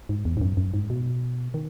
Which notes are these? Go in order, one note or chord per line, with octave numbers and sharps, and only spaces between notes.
G#2
E2
G#2
F#2
F#2
G#2
B2
D#3